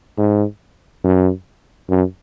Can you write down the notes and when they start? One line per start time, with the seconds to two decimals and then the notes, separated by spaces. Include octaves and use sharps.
0.18 G#2
1.04 F#2
1.89 F#2